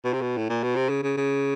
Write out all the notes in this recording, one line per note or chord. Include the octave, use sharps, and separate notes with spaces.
B2
C3
B2
A2
A#2
B2
C3
C#3
C#3
C#3